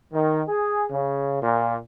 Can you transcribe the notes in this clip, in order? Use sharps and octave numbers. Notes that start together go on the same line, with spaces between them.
D#3
G#4
C#3
A#2